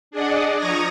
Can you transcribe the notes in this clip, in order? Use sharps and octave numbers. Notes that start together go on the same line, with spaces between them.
D4 G#4 D5 D#5 F#5
F3 A#5 C#6 D#6 G#6 A#6